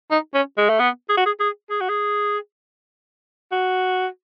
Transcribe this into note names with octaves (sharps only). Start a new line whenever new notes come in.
D#4
C#4
G#3
A3
B3
G#4
F#4
G#4
G#4
G#4
F#4
G#4
F#4